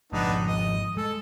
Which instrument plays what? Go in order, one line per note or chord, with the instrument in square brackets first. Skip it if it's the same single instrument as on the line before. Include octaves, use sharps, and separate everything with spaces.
[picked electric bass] G#1 F3 G#3 [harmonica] B3 D4 D#4
[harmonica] D#5
[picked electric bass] G#3 [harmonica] A4